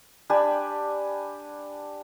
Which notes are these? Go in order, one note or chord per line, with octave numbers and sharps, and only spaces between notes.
D4 G4 G#5 B5